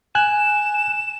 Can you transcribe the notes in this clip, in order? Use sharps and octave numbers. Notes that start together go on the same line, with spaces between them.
G#5 F#6 E7